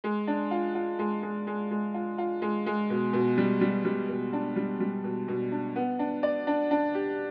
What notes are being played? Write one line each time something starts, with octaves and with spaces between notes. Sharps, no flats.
G#3
D4
F4
F4
G#3
G#3
G#3
G#3
F4
F4
G#3
G#3
B2
B2
G3
G3
G3
B2
D4
G3
G3
B2
B2
D4
B3
D4
D5
D4
D4
G4